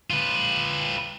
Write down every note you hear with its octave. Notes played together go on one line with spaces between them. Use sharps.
F4 B4